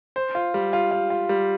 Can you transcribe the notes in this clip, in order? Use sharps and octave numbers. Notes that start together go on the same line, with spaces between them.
C5
F4
G3
F4
F4
F4
G3